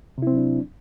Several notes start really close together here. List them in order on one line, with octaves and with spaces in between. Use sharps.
C3 E4 C4 F#3 D4